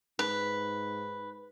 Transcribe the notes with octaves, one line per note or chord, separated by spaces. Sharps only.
G#2 B4